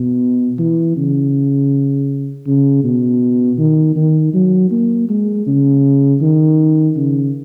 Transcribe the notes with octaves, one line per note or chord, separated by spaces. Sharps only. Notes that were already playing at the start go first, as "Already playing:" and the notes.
Already playing: B2
E3
C#3
C#3
B2
D#3
D#3
F#3
A#3
G#3
C#3
D#3
C#3